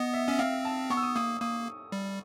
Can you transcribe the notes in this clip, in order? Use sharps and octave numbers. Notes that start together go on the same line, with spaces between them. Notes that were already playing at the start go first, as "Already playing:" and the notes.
Already playing: B3 D#5
E5
C#4 E5
C4 F5
A5
B3 C#6
E6
D#6
A#3 D#6
A#3 D#6
G3